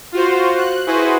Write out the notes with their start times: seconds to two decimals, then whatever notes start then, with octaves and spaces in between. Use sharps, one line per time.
0.12 F4 F#4 C5
0.57 F#6
0.87 E4 F#4 G#4 B4 C5